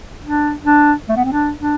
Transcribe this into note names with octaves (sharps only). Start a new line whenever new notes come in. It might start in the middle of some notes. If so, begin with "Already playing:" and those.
D4
D4
A3
B3
C4
D4
D4